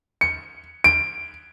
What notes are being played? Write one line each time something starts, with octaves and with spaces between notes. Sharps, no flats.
C#7
D7